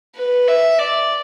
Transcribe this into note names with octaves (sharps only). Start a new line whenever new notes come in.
B4
E5
D5